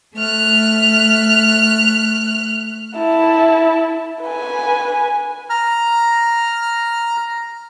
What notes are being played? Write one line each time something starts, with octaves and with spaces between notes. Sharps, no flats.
A3 F6 F#6
E4 A5
B4 G#5
A#5 F6